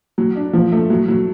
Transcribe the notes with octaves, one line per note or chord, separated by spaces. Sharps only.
F#3
D4
F3
A3
F#3
F#3